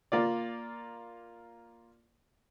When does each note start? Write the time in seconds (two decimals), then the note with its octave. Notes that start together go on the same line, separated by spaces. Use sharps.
0.12 A#3 F4 D5